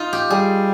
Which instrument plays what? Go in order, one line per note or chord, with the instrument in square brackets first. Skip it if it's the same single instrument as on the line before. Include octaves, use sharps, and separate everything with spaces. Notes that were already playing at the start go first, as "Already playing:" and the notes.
Already playing: [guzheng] D#4 F4
G4
[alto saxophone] G3 [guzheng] G#4